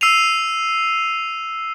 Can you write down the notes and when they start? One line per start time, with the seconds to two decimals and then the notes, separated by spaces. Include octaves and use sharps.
0.01 E6 C7 D#7 F7